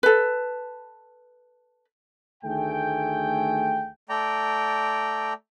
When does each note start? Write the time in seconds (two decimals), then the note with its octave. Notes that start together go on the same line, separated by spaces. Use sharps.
0.03 A4 B4
2.44 D2 D#3 A3 G#4 G5
4.09 A3 D5 G5 A#5